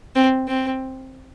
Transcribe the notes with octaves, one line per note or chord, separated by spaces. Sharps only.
C4
C4